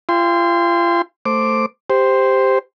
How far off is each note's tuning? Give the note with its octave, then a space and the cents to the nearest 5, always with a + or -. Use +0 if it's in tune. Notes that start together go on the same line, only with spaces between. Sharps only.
F4 -35 G5 +30 C6 -20
A3 +10 C5 +0 D6 +0
G4 +10 C5 -5